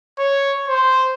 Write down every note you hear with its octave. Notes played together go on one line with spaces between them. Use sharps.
C#5
C5